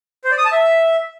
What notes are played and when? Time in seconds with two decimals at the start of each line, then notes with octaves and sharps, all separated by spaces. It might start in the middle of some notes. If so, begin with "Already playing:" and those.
0.24 C5
0.31 D5
0.38 D#6
0.45 A5
0.52 E5